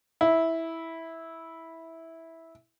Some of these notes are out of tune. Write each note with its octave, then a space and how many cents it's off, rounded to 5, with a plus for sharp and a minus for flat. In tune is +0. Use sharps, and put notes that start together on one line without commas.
E4 -10